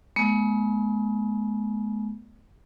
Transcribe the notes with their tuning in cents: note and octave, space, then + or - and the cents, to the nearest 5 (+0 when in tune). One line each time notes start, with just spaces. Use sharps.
G#3 +35 B3 -30